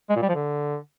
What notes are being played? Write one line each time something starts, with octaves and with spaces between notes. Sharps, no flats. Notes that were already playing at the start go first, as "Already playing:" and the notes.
G#3
A#2
G3
F3
D3